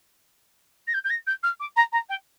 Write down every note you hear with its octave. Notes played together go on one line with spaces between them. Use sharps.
A#6
G6
G6
A#6
G6
F6
D6
A#5
A#5
G5